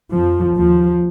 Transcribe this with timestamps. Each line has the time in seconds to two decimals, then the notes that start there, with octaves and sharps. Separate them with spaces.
0.12 F2 F3
0.57 D#2 F3